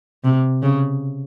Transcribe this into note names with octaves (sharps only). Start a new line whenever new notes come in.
C3
C#3